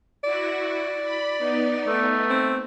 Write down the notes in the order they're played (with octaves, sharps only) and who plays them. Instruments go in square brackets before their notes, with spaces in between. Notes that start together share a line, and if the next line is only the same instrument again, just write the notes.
[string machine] E4 F#4 [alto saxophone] D5
[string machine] B5
B3 D#4
[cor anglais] A3
[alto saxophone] C4